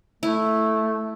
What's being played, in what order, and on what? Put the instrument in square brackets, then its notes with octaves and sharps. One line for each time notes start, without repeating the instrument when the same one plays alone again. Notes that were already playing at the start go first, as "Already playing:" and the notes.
[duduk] A3 [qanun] E4